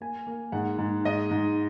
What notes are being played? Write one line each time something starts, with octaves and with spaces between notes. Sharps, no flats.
A#3 G#5
A#3
G#2 F#5
G#2
G#2 D#5
G#2